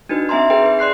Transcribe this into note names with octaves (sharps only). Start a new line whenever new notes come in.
D4 D#4 F#4 B4
C4 E5 G#5 A#5 C6
G#4 B4 G5
B4
D5 C6 F#6 C7